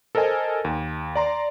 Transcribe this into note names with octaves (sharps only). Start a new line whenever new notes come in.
A4 A#4 C5 D#5 G#5
D#2
D5 A#5 C6